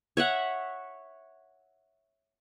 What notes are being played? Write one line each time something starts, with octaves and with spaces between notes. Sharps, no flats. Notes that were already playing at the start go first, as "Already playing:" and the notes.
C#5 E5 F#5